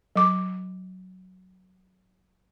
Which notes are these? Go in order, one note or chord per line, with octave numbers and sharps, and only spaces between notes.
F#3 D6